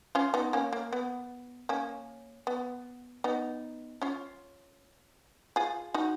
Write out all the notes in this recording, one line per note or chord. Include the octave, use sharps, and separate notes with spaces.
C#4 F4
B3 D#4
A#3 C#4
A#3
B3
A#3 C#4
B3
B3 D#4
C#4 F4
F4 G#4
D#4 F#4